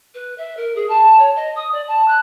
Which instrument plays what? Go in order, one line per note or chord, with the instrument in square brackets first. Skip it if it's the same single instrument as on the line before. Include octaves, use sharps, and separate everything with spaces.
[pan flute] B4
E5
A#4
G#4
A5
C#5
D#5
D#6
D5
A5
F#6